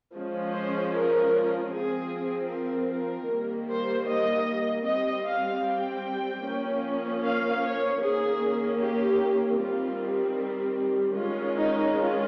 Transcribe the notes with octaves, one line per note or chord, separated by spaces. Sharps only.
F3 G#3 C#4
C5
A#4
F3 C4 G#4
A#4
A#4
D#3 G3 A#3
C5
D#5
G3 C4 D#5
F5
G5
F3 A#3 C#4
F5
C#5
D#3 A#3 C#4 G#4
G4
D#3 G3 C4 F4
D#3 G#3 C#4 F4
D#4
F4